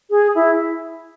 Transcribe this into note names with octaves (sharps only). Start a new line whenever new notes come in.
G#4
E4